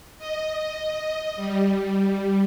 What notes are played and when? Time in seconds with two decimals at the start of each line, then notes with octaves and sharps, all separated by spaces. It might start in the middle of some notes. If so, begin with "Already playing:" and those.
0.18 D#5
1.36 G3